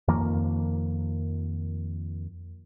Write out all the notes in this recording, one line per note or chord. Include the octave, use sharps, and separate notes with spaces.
F2 D#3 F3 A#3